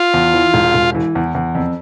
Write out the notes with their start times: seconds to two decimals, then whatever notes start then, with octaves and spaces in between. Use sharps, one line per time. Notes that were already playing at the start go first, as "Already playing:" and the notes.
Already playing: F4
0.14 E2
0.34 E3
0.54 E1
0.74 E1
0.95 E3
1.15 E2
1.35 E2
1.55 F2